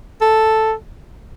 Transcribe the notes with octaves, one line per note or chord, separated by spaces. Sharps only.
A4